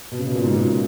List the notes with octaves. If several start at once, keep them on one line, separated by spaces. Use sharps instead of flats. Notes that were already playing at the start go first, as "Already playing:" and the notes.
B2
C#3
B2
A#2
G#2
A#2
C#3